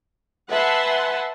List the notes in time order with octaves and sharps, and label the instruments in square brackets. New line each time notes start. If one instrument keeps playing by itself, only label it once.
[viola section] B4 E5 F#5 G#5 A5 C6